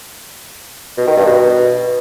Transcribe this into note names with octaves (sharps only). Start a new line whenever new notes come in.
B2
D#3
G2
B2